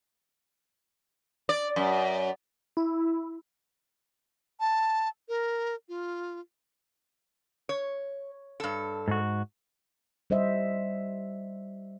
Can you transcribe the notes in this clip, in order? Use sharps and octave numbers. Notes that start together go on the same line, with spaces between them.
D5
F#2
E4
A5
A#4
F4
C#5
G2 A4
G#2 F#4
G3 C5 D#5 E5